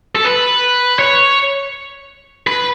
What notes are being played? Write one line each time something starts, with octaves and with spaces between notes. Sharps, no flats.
A4
B4
C#5
B4